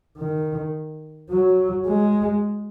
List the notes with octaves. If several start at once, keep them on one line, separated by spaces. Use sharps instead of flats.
D#3
F#3
G#3